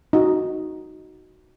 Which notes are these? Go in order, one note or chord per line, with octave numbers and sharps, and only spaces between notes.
D#4 F#4